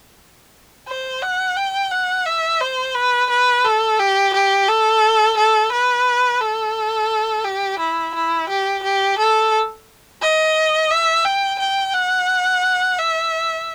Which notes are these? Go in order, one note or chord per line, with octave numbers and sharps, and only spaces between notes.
C5
F#5
G5
F#5
E5
C5
B4
B4
A4
G4
G4
A4
A4
B4
A4
G4
E4
E4
G4
G4
A4
D#5
E5
G5
G5
F#5
E5